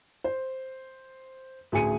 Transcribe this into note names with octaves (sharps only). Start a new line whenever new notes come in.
C5
A1 D2 G#4 G#5 C#7 D#7